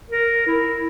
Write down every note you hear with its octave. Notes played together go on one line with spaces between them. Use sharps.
A#4
E4